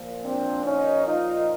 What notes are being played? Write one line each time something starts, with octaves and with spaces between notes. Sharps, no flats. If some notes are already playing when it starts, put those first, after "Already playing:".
Already playing: A#2 F3
C4 D4
C#4 D#4
D#4 F4